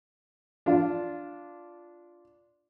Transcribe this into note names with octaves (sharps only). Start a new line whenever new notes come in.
D4 F4